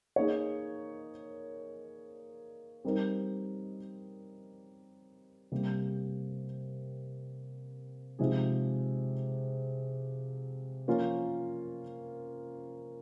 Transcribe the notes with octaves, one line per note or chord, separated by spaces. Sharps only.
A#3 D#4 G#4 C#5
G3 C4 D#4 A#4
C3 G3 A#3
C3 F3 G#3 D#4 G#4
F3 A#3 C#4 F4 A#4